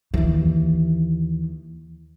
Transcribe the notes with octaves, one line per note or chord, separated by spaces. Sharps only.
D#2 E3